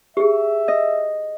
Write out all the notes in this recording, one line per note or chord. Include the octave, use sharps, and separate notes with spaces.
G4 G#4 E5
D#5